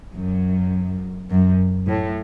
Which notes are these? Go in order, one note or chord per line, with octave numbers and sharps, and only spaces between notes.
F#2
F#2
A2